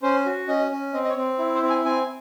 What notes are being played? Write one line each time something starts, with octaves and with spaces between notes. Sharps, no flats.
C#4 C5
F#4
C#4 D#5
C#4
C4 D#5
D#5
C#5
C4
E4
C5
C4
G#5
C4 G#5